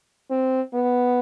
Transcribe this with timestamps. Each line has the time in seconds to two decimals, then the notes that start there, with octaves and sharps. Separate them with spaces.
0.30 C4
0.74 B3